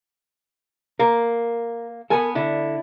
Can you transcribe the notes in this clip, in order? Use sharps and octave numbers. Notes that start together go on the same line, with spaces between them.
A#3 A#4
B3 A4 A#4 G#5 A5
D3 E4